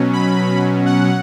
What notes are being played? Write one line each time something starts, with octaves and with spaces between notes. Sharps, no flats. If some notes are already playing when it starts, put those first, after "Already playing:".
Already playing: B2 F#3 C#4
B5
F#5